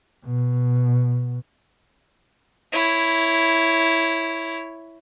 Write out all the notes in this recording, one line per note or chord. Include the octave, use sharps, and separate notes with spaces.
B2
E4 C#5